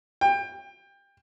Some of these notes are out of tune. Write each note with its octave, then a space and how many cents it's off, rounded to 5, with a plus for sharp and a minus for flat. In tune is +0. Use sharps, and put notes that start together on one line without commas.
G5 +25